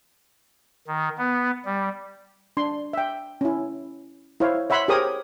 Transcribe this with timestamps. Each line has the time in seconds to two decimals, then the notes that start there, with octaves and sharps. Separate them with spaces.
0.87 D#3
1.18 B3
1.65 G3
2.57 D4 C6
2.93 E5 G5
3.41 C#4 E4
4.40 E4 C5 C#5 F5
4.70 C#5 E5 F#5 B5 C6
4.88 G4 G#4 A#4 C5 C#5 D#6